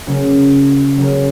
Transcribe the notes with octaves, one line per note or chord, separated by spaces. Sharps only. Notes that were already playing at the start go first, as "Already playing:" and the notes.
C#3 F#3 A#3 C#4
C#3 F#3 A#3 C#4